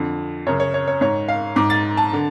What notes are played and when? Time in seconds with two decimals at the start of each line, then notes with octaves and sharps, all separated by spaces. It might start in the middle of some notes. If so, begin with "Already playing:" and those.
Already playing: F2 D3
0.46 F#2 C#3 C#5
0.60 C#5
0.74 C#5
0.88 C#5
1.01 G#2 C#5
1.29 F5
1.56 G#2 D6
1.70 A6
1.97 A5
2.13 D3